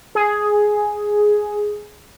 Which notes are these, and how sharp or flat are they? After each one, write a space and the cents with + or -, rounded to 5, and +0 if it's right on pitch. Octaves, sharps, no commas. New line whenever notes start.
G#4 +5